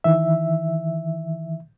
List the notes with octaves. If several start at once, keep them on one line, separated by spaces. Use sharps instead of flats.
D#3 E3 E5